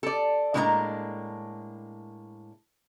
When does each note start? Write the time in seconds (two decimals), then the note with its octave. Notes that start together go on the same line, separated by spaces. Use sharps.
0.03 A4 D5
0.54 A2 G#3 A#3 D4 E4 A#5